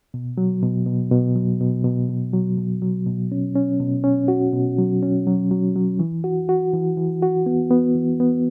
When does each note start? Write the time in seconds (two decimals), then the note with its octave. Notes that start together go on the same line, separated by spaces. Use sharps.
0.14 B2
0.38 F#3
0.62 B2
0.86 B2
1.11 B2
1.36 F#3
1.60 B2
1.84 B2
2.10 B2
2.33 F#3
2.58 B2
2.82 F#3
3.06 B2
3.32 C#4
3.56 C#4
3.80 B2
4.04 C#4
4.28 F#4
4.53 B2
4.78 F#3
5.02 C#4
5.27 F#3
5.51 F#3
5.76 F#3
5.99 E3
6.24 F#4
6.49 F#4
6.74 E3
6.97 E3
7.22 F#4
7.46 B3
7.70 B3
7.95 E3
8.20 B3